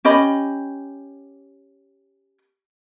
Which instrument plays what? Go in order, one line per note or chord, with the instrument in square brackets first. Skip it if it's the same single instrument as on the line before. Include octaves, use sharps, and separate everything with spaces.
[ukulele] C#4 G4 D#5 B5